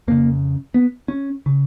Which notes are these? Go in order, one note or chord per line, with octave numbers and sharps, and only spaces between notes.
F2 C#3 A#3
B3
C#4
C#3